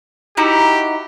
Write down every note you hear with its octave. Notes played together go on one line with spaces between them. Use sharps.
D#4 E4 F#4 G4